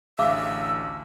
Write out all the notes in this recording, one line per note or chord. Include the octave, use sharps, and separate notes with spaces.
A1 D2 E5 F5 D6 E6